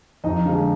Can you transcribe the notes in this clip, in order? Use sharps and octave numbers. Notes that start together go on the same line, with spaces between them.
F2 D#4 D#5
D3 F3 G#3